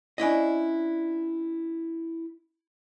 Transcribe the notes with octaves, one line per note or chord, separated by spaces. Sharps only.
C#4 D4 E4 D#5